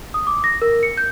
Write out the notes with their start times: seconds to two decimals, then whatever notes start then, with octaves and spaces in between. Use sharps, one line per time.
0.14 D#6
0.27 D6
0.44 A#6
0.62 A#4
0.83 C#7
0.97 G6